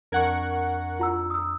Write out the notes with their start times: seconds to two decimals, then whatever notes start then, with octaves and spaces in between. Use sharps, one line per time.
0.12 F2 D4 A#4 F#5 C#6 G#6
0.99 F4 A#5 E6
1.30 D#6 E6